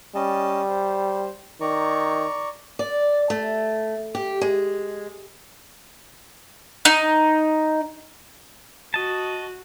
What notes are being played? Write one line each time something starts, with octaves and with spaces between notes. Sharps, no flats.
G3 C#4 D#5 A5
C5
D#3 D5 A#5 C#6
D5
A3
G4
G#3
D#4
F#4 D#5 A5